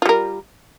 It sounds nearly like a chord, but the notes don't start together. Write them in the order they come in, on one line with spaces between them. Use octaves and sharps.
F4 G3 A#4